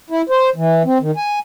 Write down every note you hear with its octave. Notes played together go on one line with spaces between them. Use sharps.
E4
C5
E3
C4
D#3
G#5